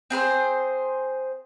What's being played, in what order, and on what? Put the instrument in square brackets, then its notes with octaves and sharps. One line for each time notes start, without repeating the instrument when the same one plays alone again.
[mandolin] C4 G#4 B4 C5